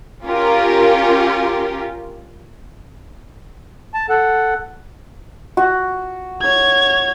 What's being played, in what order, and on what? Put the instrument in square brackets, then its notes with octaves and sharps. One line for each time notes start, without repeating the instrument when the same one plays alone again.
[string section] C#4 F4 G4 A#4
[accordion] A5
A4 F#5
[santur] F#4
[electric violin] C#5 G#6